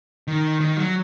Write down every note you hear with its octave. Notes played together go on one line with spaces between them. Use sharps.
D#3
D#3
F#3